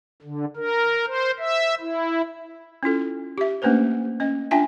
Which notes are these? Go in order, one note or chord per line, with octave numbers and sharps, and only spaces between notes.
D3
A#4
C5
E5
E4
C#4 E4 F4 A4
G4 E5
A3 A#3 C#4 D4 B4 C5
C#4 D#5
D4 F4 E5 G5 G#5